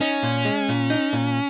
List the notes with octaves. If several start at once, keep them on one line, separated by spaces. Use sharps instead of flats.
C#4 D#4
A#2
G#3
A#2
D#4
A#2